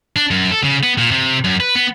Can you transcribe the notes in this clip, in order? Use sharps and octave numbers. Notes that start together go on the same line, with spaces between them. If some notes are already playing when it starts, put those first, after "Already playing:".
D4
F#2
A4
C#3
B3
A#2
C3
F#2
B4
B3